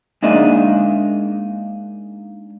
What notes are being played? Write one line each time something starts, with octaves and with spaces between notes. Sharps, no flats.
G#3 A#3 D4 D#4 D#5 E5